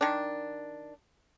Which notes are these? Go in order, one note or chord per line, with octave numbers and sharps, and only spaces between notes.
D#3 D4